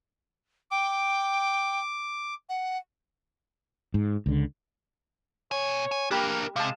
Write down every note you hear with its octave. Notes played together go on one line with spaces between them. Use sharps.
G5 D6
F#5
G#2
C#2 D3
B2 C#5 G#5
G#5
A#3 D4 G4 A#4 B5
C3 G#3 F5 A5